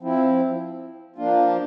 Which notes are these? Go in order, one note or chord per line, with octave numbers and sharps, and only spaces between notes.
F3 C4 E4
F3 A#3 D4 F4